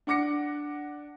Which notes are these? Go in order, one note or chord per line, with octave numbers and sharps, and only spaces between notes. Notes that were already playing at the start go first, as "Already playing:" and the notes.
D4 F#5 D6 A#6 C#7